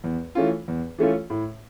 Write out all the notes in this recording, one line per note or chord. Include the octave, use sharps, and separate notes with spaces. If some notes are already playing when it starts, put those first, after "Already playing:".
E2
E3 A3 C#4 F4
E2
E3 A3 C#4 F4
A2